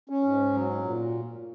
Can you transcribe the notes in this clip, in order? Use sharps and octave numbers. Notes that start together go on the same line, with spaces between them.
C#4
G#2
F#3
A#2